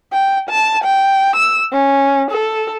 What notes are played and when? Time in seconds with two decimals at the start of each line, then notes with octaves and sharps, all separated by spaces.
0.13 G5
0.49 A5
0.84 G5
1.36 E6
1.72 C#4
2.31 A4